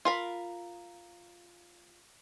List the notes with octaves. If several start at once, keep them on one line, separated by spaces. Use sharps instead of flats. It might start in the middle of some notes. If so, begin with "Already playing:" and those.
F4 A#4 B5